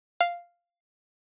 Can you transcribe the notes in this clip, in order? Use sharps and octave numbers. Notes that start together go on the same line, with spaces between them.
F5